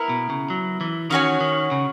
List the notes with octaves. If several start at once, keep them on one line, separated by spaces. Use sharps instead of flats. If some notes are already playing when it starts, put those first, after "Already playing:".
Already playing: B3 E4 A#4
B2
C#3
F#3
E3
D#3 C#4 F#4 C#5 G#5
D#3
C#3